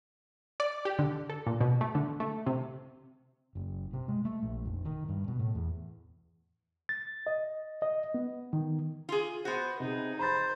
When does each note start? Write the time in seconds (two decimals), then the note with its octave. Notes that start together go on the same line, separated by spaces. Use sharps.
0.60 D5
0.85 G4
0.99 D3
1.29 A4
1.47 A#2
1.60 B2
1.81 A3
1.95 D3
2.20 A3
2.46 C3
3.55 F#1
3.93 C3
4.08 G#3
4.25 A3
4.42 A#1
4.65 F1
4.85 D#3
5.09 G2
5.28 B2
5.39 A2
5.55 E2
6.89 A6
7.27 D#5
7.82 D#5
8.14 B3
8.53 D#3
9.09 F4 G#4
9.45 B3 F#4 C5
9.80 C3 D#4 G#4
10.19 C5 A#5 B5 A6